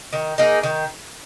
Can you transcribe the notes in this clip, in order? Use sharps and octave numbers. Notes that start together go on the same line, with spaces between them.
D#3
A#3 D#4 G#4
D#3